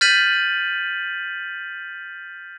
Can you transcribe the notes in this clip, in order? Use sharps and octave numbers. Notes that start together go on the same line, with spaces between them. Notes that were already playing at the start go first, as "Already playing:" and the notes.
F6 G6 A6 B6 D#7 F#7